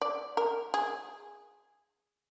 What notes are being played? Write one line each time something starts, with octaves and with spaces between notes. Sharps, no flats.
D5
A#4
G#4